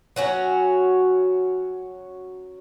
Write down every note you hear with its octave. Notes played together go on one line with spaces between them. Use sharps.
F#3 C#4 F#4